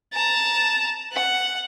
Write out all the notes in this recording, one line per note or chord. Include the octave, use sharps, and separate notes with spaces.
A5 A#5
F#5